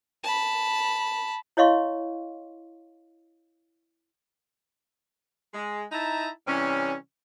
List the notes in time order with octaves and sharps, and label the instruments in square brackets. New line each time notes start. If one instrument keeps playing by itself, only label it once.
[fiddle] A5 B5
[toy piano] E4 C#5 D#5 F5 C6 C#6
[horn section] G#3
D#4 E4 D#5 E5 A5 A#5
C3 E3 G3 C#4